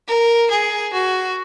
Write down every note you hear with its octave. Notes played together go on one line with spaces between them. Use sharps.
A#4
G#4
F#4